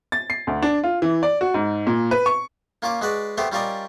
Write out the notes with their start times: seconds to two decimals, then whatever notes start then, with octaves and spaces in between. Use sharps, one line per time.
0.12 A6
0.30 C7
0.47 D2
0.62 D4
0.84 F4
1.02 E3
1.23 D5
1.41 F#4
1.54 G#2
1.87 A#2
2.11 B4
2.26 C#6
2.82 A#3 C#4 F4 D6
3.01 G#3 F#4 B4 D5
3.37 A3 B3 G4 C5
3.52 G3 C#4 F4 A#4 D5 D#5